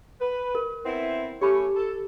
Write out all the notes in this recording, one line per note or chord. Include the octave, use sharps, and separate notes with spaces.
B4
A#4
B3 C4 E4
A3 C#4 G4 C#5 B5 D6
A4